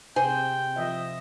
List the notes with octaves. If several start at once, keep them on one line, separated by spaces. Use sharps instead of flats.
C3 G#4 C5 G5
F3 D#5 E5